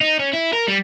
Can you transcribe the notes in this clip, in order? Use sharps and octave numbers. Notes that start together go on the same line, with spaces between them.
D#4
C#4
E4
A#4
G3